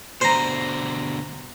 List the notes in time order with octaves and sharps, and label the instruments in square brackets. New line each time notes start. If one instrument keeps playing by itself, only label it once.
[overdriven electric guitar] B2 D3 [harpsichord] C5 A#5